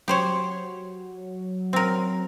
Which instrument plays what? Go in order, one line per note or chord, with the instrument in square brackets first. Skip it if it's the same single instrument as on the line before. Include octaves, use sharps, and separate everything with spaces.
[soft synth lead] F#3 [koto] G4 C5 C#5
[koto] C4 A#4